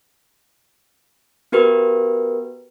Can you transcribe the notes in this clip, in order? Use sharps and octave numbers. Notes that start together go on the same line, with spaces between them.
B3 F#4 G4 A#4 B4